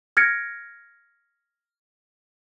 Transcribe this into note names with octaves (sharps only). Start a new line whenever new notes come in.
F6 G#6 A#6 C#7 D7